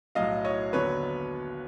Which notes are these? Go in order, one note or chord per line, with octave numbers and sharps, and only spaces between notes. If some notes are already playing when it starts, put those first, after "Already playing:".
B1 A2 F#3 D#5 F5
C#5 D#5
D#2 D3 F#3 B3 B4 C#5